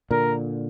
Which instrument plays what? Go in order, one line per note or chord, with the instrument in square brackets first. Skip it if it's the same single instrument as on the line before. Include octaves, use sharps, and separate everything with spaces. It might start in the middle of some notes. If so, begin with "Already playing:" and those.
[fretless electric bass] A#2 D3 [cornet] A#4